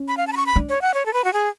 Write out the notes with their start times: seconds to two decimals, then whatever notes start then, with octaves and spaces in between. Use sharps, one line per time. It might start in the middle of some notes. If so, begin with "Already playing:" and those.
Already playing: C#4
0.08 B5
0.17 F5
0.27 A5
0.33 B5
0.37 C#6
0.46 B5
0.56 D4
0.69 C#5
0.82 F#5
0.94 C#5
1.06 A4
1.13 B4
1.24 F#4
1.33 G#4